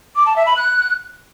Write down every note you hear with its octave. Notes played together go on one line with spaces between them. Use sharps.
D6
A5
E5
B5
F#6